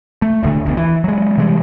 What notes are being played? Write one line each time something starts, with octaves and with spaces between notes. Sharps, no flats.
A3
D1 D2 D3 A3
E1 D2 G2 B2
E3
F#3 G#3
C3 E3 G3 G#3